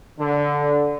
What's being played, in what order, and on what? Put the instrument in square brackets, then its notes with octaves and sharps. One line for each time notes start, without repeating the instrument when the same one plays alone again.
[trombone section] D3